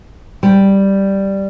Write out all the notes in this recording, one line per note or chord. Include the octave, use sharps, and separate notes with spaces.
G3